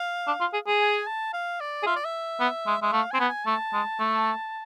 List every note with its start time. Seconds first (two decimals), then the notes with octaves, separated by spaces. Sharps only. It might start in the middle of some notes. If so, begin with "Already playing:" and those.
Already playing: F5
0.27 D4
0.41 F4
0.54 G#4
0.67 G#4
0.81 G#5
1.07 A5
1.33 F5
1.60 D5
1.83 G#4
1.86 F4 E5
1.96 D5
2.05 E5
2.40 B3
2.67 G#3
2.82 G#3 E5
2.93 A3 F5
3.11 C4 G#5
3.20 B3
3.29 G#5
3.46 A3 A5
3.73 G#3
3.99 A3